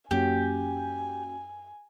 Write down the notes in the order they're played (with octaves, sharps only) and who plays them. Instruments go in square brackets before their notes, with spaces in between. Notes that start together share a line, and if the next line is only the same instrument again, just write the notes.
[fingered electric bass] F#2 [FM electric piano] A#3 C#4 F#4 [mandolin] G4 [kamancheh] G#5